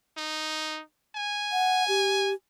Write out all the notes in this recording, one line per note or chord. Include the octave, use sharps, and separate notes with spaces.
D#4
G#5
F#5
G4